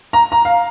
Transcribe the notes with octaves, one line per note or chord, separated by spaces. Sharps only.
A#5
A#5
F5